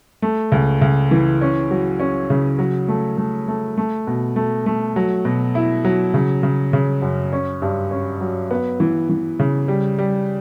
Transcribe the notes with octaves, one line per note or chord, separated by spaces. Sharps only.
A3
C#2
C#2
E3
C#4
F#3
C#4
C#3
F#3
A3
A3
A3
A3
B2
A3
A3
F#3
B2
E4
F#3
C#3
C#3
C#3
F#2
C#4
G2
C#4
F#3
B3
E3
E3
C#3
G3
G3